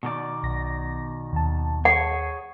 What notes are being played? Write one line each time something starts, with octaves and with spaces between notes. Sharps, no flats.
B2 D#3 D5
B1 A#6
D#2 A5
G#4 C#5 F#5